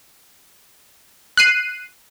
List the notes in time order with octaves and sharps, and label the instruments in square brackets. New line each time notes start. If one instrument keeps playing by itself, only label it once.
[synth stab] F#6 C7 D#7